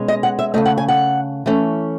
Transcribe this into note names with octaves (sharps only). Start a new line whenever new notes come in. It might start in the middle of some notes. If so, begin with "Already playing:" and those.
Already playing: B2 G#3 C#4
D#5
F#5
E5
C#3 E3 A3 D#5
F#5
G#5
F#5
E3 A3 C#4